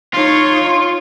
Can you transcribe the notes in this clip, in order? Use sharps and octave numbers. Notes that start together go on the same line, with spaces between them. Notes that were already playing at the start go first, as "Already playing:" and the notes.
D#4 F4 C#5